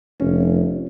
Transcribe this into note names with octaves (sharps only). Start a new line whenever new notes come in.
F1 C#4